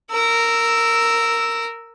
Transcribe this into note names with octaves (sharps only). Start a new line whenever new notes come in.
A#4 E6